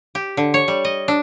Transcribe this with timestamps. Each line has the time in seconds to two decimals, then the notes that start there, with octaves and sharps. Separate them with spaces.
0.15 G4
0.37 D3
0.54 C#5
0.68 G3
0.85 D#5
1.08 D4